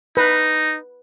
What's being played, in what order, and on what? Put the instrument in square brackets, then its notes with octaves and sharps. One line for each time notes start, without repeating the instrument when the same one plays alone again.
[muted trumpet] D#4 [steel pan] B4